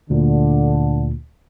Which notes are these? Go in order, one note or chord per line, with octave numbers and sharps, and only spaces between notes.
D2 A#2 D3